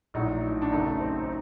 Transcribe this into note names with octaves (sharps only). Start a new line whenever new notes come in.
A#1 A2 F#3 A3 D#4
D4
F#1 F#2 F#3 A3 D#4
C4
D#4